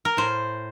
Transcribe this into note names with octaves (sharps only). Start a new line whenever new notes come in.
A#4
A2 C5